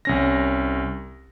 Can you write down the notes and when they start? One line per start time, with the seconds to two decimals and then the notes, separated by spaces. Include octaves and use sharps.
0.05 C2 C#4 A#6